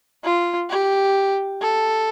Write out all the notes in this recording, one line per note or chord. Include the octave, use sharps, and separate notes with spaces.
F4
G4
A4